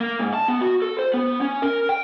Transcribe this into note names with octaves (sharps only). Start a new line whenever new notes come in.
A#3
G#2
A5
B3
F#4
A4
C5
B3
C#4
A#4
G5